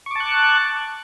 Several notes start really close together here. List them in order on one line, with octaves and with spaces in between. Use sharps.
C#6 D6 A5 F#6